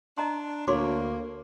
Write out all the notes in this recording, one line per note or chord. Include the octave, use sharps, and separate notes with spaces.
D4 D#5 A#5 C6
D2 A#3 F#4 C#5 C6 D6